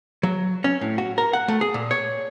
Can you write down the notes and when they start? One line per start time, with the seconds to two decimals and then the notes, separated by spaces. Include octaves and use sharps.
0.23 F#3
0.64 C#4
0.81 A2
0.98 F#4
1.18 A#4
1.33 F#5
1.48 A3
1.61 G#4
1.74 A#2
1.91 C#5